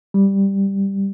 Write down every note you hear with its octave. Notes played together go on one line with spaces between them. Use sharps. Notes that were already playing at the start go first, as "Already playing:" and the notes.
G3